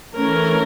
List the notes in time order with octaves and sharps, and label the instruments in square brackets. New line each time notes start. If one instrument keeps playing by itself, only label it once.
[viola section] E3 A3 C#4 A#4